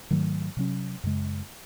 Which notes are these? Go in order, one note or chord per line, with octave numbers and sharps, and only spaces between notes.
G#2 D#3 F#3 A3
C3 F#3 C#4
F#2 C#3 G#3